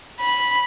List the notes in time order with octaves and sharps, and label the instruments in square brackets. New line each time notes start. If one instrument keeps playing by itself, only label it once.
[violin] B5